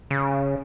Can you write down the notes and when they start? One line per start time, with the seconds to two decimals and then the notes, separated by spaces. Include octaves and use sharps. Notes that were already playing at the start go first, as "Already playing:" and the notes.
0.10 C#3